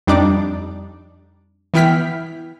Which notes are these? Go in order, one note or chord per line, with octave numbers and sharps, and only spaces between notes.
F2 G3 D4 D#4 D5 D6
E3 B3 E4 G5 F6 B6